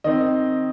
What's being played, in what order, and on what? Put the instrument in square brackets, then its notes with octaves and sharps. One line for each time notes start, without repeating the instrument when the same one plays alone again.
[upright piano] D#3 C4 D#5